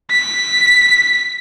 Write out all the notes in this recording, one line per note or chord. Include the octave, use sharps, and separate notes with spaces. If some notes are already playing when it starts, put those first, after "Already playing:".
B6